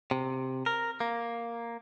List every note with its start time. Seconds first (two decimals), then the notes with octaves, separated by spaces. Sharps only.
0.11 C3
0.66 A#4
1.00 A#3